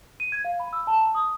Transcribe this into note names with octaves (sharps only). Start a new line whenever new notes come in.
D#7
G#6
F5
B5
E6
A5
A#5
D#6